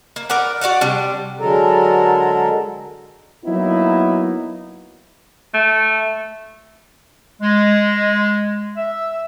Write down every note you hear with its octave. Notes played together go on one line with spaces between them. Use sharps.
A#3
A#4 B4 D5 F#5
F#4 D5 F5 F#5
C3 G3 D4
D3 F#3 G#3 A4 A#4
F#3 A#3 B3 D#4 E4
A3
G#3
E5